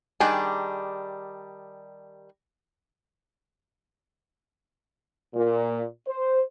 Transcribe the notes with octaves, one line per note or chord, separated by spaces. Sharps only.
D#3 G3 D4 G#4 G#5
A#2
C5